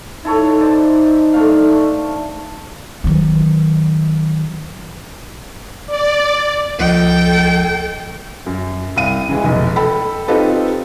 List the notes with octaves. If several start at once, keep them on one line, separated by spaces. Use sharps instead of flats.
D#4 E4 A4 C#5
C5 D5
A3 D4 F5
D#3 F#3
D5
C#2 F3 A4 D#5 G5
F#2
C2 F5 D#7
C#3 E3 G#3
F1 B1
A4 G5 B5
C4 D#4 F4 G4 A4 B4